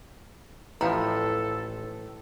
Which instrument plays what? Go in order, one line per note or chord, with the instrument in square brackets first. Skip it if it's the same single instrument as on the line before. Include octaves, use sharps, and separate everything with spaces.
[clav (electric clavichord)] A1 F3 [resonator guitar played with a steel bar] A2 [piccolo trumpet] A4 [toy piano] F5 G5 A#5